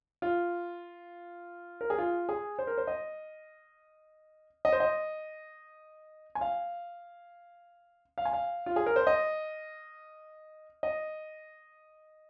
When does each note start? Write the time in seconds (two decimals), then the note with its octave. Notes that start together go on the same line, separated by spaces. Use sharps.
0.22 F4
1.81 A#4
1.90 G#4
1.98 F4
2.29 G#4
2.59 C5
2.67 A#4
2.78 C5
2.87 D#5
4.65 D#5
4.73 C5
4.80 D#5
6.35 G#5
6.41 F5
8.18 F5
8.25 G#5
8.33 F5
8.66 F4
8.76 G#4
8.86 A#4
8.96 C5
9.07 D#5
10.83 D#5